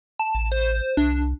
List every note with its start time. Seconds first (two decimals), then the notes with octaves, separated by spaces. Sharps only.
0.19 A5
0.35 A1
0.52 C5
0.97 C2 D4